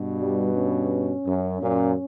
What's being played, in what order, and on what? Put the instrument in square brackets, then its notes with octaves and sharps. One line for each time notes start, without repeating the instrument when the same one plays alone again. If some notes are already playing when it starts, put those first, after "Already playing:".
Already playing: [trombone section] G2 B2
[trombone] G3
C#4
[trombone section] F#2
F#2 A#2